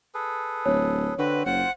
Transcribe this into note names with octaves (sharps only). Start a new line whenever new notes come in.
G#4 A4 B4
D1 C#5
D3 C4 F#4 B4
F#1 F4 C5 F#5